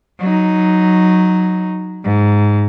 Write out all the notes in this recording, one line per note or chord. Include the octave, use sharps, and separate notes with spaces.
F#3 D#4
G#2